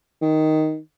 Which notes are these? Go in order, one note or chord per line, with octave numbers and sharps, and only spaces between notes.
D#3